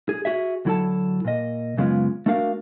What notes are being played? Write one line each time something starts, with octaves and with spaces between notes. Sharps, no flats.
G#4
F#4 G#4 E5
D2 F#3 E4 F#4 A4 A5
A#2 D#5
F#2 C#3 G#3 B3 F4
A3 D4 F#4 A#4 F5